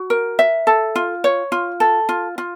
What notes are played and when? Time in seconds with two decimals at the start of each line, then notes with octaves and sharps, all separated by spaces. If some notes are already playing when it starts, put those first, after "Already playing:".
Already playing: F#4
0.10 A#4
0.39 E5
0.67 A4
0.95 F4
1.24 C#5
1.52 F4
1.80 A4
2.09 F4
2.38 F4